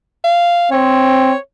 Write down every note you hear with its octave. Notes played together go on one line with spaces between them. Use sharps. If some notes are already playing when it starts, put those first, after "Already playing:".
F5
C4 C#5